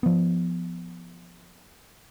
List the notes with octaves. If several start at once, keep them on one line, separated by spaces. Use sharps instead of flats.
F3 B3